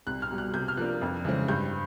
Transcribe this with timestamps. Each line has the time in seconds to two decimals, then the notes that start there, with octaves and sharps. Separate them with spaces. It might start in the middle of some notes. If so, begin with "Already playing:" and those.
0.07 C2 F#6
0.22 F6
0.30 B2 G3
0.38 F#6
0.54 C3 G6
0.68 F6
0.77 F3 A#3 D4 F#6
1.02 F2
1.25 C#3 E3 G#3 C4
1.48 G2 G6